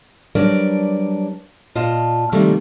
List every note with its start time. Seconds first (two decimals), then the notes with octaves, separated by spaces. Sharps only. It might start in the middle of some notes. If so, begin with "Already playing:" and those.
0.35 F#3 G3 D4 A#4 B4 D5
1.75 A#2 F4 D#5 A5
2.32 C3 D#3 F3 G3 A3 A#3